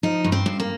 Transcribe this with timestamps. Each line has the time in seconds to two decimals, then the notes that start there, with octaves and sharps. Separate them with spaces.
0.03 F3 D#4
0.24 G2
0.32 C4
0.46 G2
0.60 A#3